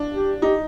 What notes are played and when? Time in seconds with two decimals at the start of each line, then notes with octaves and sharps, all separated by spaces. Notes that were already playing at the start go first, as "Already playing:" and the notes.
Already playing: D4
0.13 G4
0.42 D#4 G4